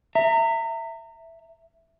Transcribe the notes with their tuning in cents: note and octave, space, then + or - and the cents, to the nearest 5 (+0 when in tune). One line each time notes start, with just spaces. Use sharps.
E5 +0 A#5 -30